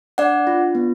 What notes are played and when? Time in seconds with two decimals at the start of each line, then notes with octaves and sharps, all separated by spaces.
0.18 D4 D5 F#5
0.47 F4
0.75 B3